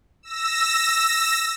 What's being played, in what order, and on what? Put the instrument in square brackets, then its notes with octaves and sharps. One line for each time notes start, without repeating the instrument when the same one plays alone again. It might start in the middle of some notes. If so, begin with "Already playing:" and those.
[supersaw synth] E6 A#6